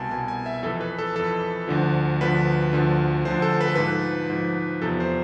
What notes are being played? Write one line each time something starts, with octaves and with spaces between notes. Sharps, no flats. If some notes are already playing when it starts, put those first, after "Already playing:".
Already playing: C2 B2 G#5 A5
C2 B2 G#5
G#5
E5
F2 E3 A4
B4
A4
F2 E3 A4
D2 D3 F3
D2 D3 F3 B4
D2 D3 F3
D2 D3 F3 C5
A4
B4
A4
G#2 F3 B4
G#2 F3
E2 C3 F3 A4
C5